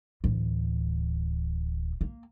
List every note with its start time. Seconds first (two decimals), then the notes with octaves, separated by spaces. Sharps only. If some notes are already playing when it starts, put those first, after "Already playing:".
0.24 D1 E3
2.01 A#3